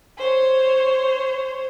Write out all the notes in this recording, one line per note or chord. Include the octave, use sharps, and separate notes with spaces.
C5 C#5